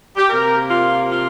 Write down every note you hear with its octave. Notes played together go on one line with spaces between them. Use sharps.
G4
C3 A#3 A#4
F4
F4